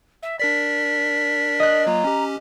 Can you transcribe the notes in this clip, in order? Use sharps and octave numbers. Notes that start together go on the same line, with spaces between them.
E5
D4 A#4 D5 B6
D#5 F#6
F#3 A#3 F4 A#5
C#4 G4